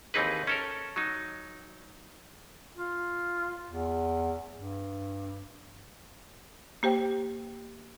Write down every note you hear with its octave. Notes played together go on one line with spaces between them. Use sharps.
D#2 E3 C4 D#4 G#4 B4
C#4 A4 A#4
F#3 D#4
F4
E2
G2
A#3 G4 C5 G5